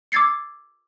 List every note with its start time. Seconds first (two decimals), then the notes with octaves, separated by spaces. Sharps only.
0.12 D6 E6 G#6 A6 C7 C#7